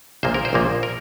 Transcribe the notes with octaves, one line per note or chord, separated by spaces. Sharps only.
A#1 A#2 F3 A#3 C5
A#4
C5
A#1 A#2 F3 A#3
A#4